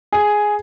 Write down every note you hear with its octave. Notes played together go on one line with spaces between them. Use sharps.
G#4